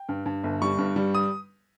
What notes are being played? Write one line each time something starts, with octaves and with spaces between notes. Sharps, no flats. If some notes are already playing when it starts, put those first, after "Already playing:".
Already playing: G5
G2
G2
G1
G3 C#6
G2
G3
D#6